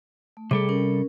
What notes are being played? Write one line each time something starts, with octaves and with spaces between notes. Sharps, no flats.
A3
C3 G3 G#4 A4 D6
C#4 A#4